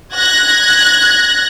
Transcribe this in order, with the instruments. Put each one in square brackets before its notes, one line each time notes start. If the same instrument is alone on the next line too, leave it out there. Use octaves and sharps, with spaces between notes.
[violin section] F#6 G#6 A#6